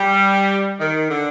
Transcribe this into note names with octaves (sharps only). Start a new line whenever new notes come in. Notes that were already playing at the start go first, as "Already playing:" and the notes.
Already playing: G3
D#3
D3